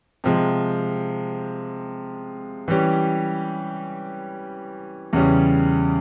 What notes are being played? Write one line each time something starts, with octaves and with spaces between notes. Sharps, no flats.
C3 F3 G#3
E3 G3 C#4 G4
E2 C#3 G3 C#4